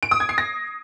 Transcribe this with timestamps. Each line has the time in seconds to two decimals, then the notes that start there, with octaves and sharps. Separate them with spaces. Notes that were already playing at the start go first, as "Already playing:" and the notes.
0.03 D7
0.11 D#6
0.20 G#6
0.29 C7
0.38 A#6